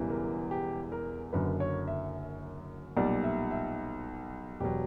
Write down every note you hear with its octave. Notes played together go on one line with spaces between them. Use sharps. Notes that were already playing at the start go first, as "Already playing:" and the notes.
Already playing: E1 E2 C#3 E3 G3
A#4
G4
A#4
F#1 F#2 D3 B4
C#5
E5
B1 A#2 G3 D5
E5
E5
E1 B2 F#3 G4